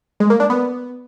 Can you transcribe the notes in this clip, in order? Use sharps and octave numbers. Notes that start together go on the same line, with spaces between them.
G#3
A#3
D4
B3